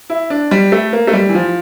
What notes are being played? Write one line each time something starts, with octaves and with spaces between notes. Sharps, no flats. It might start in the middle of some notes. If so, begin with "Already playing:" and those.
E4
D4
G3
A3
A#3
A3
G3
E3
F3